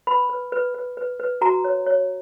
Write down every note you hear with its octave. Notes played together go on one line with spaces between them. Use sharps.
B4 B5
B4
B4
B4
B4
B4
F#4 A#5
C#5
C#5